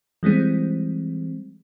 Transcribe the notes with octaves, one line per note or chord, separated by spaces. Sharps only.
E3 G3 G#3 C4